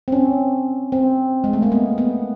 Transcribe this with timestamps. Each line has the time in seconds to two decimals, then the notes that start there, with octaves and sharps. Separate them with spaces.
0.08 C4
0.12 C#4
0.92 C4
1.44 G#3
1.53 A3
1.62 A#3
1.72 B3
1.98 B3